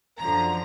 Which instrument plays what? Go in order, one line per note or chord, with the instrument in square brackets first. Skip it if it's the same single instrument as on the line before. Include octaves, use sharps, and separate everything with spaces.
[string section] F#2 D3 F3 A#5